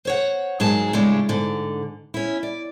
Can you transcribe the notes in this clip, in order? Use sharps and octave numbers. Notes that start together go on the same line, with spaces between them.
C5 C#5 F#5
G#2 F#3 G#4 A#4 A5
A2 C#3 G3 G#3 D4
G#2 D3
C#4 E4
D5